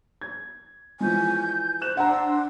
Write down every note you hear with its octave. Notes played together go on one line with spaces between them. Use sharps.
G#6
E3 F3 G#3 G#5 G6
C5 F#6 E7
D4 C5 F#5 A#5 C6 E6